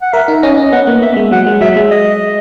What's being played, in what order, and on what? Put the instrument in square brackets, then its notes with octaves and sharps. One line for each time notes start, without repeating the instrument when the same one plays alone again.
[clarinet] F#5
[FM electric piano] A#4 [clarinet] E5
[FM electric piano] D#4
[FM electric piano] C#4 [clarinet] D#5
[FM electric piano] C#4
[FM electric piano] B3 [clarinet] F#5
[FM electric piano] A#3
[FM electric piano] A#3 [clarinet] E5
[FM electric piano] G#3
[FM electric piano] F#3 [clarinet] F#5
[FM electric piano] G#3
[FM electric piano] F#3 [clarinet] E5
[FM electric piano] G#3
[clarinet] D#5